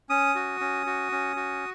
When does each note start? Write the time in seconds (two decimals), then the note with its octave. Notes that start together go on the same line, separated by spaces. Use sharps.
0.10 C#4 D#6
0.35 F#4
0.60 C#4
0.86 F#4
1.12 C#4
1.36 F#4